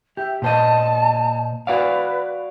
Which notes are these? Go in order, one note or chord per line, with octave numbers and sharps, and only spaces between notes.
G4 E5
A#2 C5 D#5 A5
F#4 B4 D5 F5